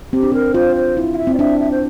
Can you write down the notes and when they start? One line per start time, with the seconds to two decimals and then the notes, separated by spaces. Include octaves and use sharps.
0.13 C4 G4
0.23 D4
0.32 C4 A#4
0.54 F4 C5
0.76 C5
0.97 E4
1.14 F5
1.18 E5
1.27 C4
1.34 D5
1.39 D4 E5
1.60 E5
1.71 C5